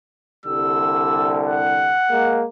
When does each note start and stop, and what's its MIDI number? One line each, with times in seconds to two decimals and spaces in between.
0.46 1.96 36
0.46 1.96 50
0.46 1.96 55
0.46 1.41 88
1.47 2.43 78
2.10 2.44 56
2.10 2.44 58